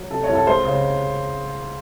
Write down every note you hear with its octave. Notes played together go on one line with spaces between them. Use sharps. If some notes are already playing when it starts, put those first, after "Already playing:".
Already playing: F#3
C3 A4
C#5
C2
A4
G#3 C5
C#3